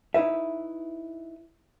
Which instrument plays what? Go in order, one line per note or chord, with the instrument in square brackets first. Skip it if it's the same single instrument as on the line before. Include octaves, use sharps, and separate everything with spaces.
[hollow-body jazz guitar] D#4 E4 B4 E5